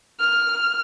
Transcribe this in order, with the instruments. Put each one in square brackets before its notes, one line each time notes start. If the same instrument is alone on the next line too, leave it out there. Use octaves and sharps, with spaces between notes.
[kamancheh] F6